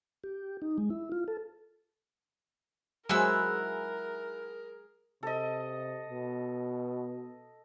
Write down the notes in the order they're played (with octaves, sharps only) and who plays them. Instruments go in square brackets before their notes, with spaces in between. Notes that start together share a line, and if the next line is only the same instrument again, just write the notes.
[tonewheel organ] G4
D#4
G#3
E4
F4
A4
[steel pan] F#3 G#3 C5 [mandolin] E4 F#5 E6 [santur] G#4 [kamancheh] A#4
[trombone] C3 [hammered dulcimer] A4 D#5
[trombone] B2